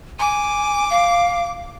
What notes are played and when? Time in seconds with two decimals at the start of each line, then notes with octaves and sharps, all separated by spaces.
0.19 G#5 D6
0.90 F5